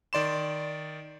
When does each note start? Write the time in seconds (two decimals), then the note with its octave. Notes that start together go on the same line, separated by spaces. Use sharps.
0.13 D#3 D5 C6 E7